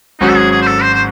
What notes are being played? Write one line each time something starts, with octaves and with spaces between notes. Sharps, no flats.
G#1 G#2 F#3 C#4 D#4 F#4
A4
G#4
G#4
C5
A4
C5
C5